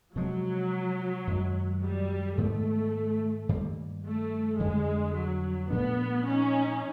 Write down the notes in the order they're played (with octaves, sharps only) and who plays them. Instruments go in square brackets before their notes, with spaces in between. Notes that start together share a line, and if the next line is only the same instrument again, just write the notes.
[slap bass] C3 F3 G#3 [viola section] F#3
[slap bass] F#2 D#3 G#3
[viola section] G3
[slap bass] G#2 D#3 G#3 B3 [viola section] A3
[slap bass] G2 D#3 G3 A#3
[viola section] A3
[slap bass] F2 D3 G3 [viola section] G#3
[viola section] F#3
[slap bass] A#2 F3 A3 D4 [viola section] B3
[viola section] C#4 D#4